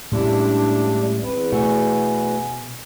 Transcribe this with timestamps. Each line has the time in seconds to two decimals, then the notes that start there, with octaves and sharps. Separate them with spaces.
0.12 A2 G3 G#3 C#4 D4 E4 G4
1.23 E2 C4 B4
1.52 B2 A3 F#4 G#5